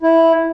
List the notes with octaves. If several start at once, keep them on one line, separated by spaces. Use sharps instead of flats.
E4